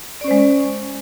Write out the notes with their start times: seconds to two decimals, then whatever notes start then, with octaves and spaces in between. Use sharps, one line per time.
0.21 D5
0.24 C#4
0.28 C5
0.31 G#3